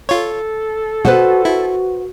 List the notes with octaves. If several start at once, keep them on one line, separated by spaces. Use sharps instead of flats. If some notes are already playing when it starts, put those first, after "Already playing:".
F4 A4 C#5
B2 F#4 B4 C5 F#5
E4 F#4